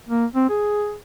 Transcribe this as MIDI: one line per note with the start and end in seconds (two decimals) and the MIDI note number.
0.09 0.25 58
0.35 0.46 60
0.50 0.96 68